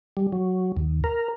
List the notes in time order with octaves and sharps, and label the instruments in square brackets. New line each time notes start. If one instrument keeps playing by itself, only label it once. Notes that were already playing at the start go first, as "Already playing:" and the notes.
[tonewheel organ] G3
F#3
D#2
A#4